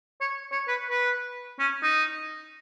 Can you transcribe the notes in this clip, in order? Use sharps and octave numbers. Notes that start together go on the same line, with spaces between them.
C#5
C#5
B4
B4
C#4
D#4